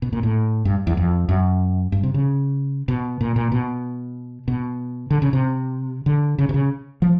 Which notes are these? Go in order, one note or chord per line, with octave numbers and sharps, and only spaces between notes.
B2
A#2
A2
G2
E2
F2
F#2
G2
C3
C#3
B2
A#2
A#2
B2
B2
D3
C#3
C3
D3
C#3
C3
C#3
F3